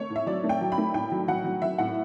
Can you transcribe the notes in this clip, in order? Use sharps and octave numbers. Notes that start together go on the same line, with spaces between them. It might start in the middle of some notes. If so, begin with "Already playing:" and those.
Already playing: A3 C#5
A2
E5
F#3 D5
A3
G5
F#3
B5
A3
A2 G5
F#3
F#3 F#5
F#3
F#3 E5
A2 F#5